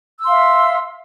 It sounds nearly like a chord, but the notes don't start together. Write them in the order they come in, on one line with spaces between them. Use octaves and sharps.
E6 C6 F5 E5